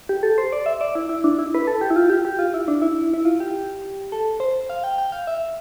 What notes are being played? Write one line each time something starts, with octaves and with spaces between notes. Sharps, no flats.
G4
A4
C5
D5
E5
D5
E4
E4
D4
E4
B4
A4
G4
E4
F4
G4
G4
F4
E4
D4
E4
E4
F4
G4
A4
C5
F5
G5
G5
F5
E5